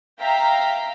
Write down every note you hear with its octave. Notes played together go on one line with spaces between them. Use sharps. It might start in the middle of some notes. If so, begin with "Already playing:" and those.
E5 F5 G5 A#5 B6